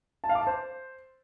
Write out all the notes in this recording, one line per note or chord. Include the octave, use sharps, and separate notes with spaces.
A5
F5
D6
A5
C5